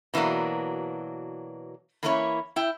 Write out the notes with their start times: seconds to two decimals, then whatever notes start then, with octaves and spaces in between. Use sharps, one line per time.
0.14 B2 E3 F#3 A#3 D4
2.03 E3 A#3 C#4 E4 A#4 C#5
2.56 E4 G5